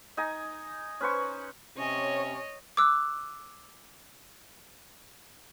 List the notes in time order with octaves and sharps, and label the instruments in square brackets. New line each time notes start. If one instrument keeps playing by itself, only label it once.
[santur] D#4 D#5 G#5
C#4 B4 C5 C#6
[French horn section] C3 C#4 [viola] C#5 D#5
[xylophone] D6 E6 F#6